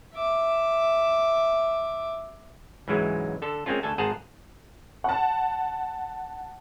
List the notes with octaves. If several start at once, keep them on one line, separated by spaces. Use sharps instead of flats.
E5 D6
C#2 G#2 E3 F#3 G#3
D3 A4
G#3 A#3 C4 C#4 F4
D2 A4 G#5 A5
G#1 G#4 C5 F#5 A5 A#5
F#5 A5